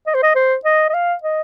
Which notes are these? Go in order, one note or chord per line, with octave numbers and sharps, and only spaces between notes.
D#5
C5
D#5
C5
D#5
D#5
F5
D#5